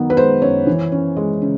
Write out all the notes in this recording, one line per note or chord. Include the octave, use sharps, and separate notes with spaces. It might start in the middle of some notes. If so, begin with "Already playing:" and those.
Already playing: D#3 F#3 B3
B4
G#3 C5
F#2 C#5
E3
C#4
G#3
C#3